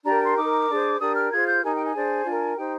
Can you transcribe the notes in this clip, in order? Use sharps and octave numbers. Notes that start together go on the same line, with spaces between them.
D4 G4 A#4 A#5
C6
D#4 A#4 D6
D4 G#4 C5
D4 G4 A#4 D#6
F6
F4 G#4 C5 G#6
G6
D#4 G4 A#4 G#5
G5
G#5
D4 G#4 C5
D4 F4 A#4
D#4 G4 C5 G5